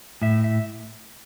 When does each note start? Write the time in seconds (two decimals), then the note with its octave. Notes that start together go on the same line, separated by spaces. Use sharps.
0.22 A2 E5
0.44 E5